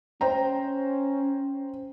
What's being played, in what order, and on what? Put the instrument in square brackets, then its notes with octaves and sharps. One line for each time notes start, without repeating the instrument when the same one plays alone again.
[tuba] C#4 [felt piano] C5 G5 A#5